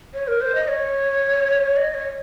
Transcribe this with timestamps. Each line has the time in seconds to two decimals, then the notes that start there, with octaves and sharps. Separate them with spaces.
0.14 C#5
0.28 A#4
0.41 C5
0.55 D#5
0.68 C#5
1.77 D#5
1.94 C#5